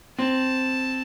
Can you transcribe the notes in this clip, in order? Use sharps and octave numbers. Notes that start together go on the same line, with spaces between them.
C4 A5